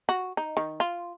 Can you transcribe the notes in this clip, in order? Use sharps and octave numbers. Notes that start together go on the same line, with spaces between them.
F#4
D#4
D#3
F4